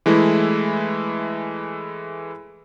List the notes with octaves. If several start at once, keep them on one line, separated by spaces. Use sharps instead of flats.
E3 G#3 A3 E4